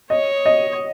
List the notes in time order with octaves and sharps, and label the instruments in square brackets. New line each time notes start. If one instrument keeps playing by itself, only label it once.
[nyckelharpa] C#5 [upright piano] D#5
[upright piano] D#5